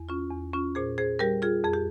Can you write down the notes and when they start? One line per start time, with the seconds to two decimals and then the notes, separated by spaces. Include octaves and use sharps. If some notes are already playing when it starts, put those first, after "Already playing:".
Already playing: E2
0.09 C#4 F4
0.31 E2
0.53 C#4 F4
0.75 A#2 G#4 C5
0.98 G#4 C5
1.19 G3 G4 A#4
1.42 F4 G#4
1.64 F2 G#4
1.73 G4